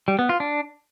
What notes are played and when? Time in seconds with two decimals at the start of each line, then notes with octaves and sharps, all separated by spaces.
0.08 G3
0.19 B3
0.29 F4
0.40 D4